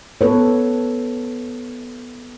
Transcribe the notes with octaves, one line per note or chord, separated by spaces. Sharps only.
B3 A4 B4 C#5